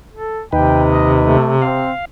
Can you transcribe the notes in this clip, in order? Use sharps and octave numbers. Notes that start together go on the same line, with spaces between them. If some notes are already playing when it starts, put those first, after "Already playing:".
A4
D#2 C3 D#4 B4 G5
D#5
A3
C4 F5